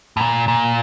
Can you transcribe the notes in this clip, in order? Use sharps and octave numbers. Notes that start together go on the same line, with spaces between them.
A2
A#2
A#2